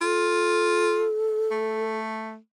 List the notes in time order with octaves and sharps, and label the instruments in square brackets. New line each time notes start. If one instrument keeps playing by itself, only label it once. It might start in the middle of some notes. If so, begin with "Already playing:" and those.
[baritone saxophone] F4 [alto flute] A4
[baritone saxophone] A3